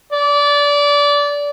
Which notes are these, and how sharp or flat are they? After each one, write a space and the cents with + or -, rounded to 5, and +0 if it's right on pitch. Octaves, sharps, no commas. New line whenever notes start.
D5 -25